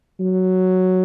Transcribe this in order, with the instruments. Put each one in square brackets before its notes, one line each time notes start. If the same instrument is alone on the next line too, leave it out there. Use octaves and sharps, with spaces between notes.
[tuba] F#3